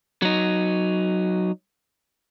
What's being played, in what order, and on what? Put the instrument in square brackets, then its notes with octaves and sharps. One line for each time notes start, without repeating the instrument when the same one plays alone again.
[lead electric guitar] F#3 D#4